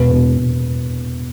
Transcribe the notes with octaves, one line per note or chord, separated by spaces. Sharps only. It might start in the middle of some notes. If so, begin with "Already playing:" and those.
Already playing: E1 B4
E1
E1